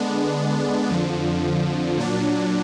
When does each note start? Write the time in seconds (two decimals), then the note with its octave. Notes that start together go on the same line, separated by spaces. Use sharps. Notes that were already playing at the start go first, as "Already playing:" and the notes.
Already playing: D3 G#3 B3 D4
0.90 F2 D3 F3
1.97 A#2 F#3 D4